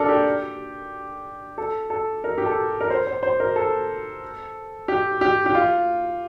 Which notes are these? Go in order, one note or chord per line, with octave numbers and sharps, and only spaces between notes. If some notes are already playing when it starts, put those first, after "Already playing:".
Already playing: D4 A4 A#4
G4
A4
A4
A#4
G4
A4
A#4
C5
C5
C5
A#4
A4
G4
G4
G4
F4